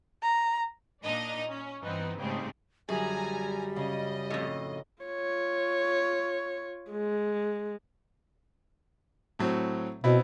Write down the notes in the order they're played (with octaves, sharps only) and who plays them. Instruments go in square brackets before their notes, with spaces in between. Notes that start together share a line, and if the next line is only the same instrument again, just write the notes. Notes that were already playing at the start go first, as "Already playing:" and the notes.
[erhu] A#5
[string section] A#2 D4 D#4 D#5
C#4
G2 E3 B3 C4 D#4
G#2 C#3 G3 A3 C4
[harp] F#2 D3 [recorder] G3 [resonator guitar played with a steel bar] G#4 [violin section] G#5 A#5
[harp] C#3 [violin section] D#5
[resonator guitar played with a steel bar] F2 A2
[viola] F4 C#5
G#3
[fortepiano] A2 F#3 C4
[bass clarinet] B2 [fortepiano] B3 C4 E4